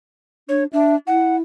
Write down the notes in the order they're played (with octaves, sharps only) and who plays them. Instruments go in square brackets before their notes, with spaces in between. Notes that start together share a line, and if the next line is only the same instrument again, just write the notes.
[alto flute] D4 [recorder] C#5
[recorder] D4 [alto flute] E5
[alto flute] E4 [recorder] F#5